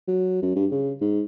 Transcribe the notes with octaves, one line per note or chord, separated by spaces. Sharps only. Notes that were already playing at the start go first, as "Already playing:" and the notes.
F#3
F#2
G2
C#3
G#2